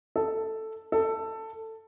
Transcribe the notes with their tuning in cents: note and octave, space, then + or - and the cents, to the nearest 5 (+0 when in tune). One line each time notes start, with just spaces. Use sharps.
A4 +5
A4 +15